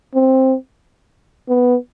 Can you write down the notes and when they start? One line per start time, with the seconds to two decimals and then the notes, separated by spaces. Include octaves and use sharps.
0.14 C4
1.49 B3